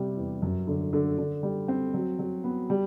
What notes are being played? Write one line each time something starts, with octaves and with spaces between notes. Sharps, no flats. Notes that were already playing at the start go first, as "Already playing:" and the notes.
Already playing: C3 G3
E2
F#2
D3
D3
D3
G3
C4
F#3
F#3
B3
G3